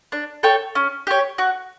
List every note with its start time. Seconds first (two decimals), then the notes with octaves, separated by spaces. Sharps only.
0.12 D4
0.43 A4 C#5 G5
0.75 C#4
1.07 G4 C#5
1.38 F#4